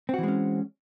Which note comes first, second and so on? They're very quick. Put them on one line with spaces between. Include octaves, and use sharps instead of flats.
C4 F#4 E3 G#3 C#4